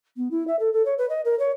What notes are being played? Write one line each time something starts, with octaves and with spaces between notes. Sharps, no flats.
B3
E4
E5
A4
A4
C#5
B4
D#5
A#4
C#5